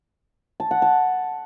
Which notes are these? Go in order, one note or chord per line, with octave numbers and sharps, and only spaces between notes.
A5
F#5
A5